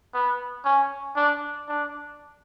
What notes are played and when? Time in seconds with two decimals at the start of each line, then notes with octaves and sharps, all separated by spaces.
0.14 B3
0.65 C#4
1.16 D4
1.69 D4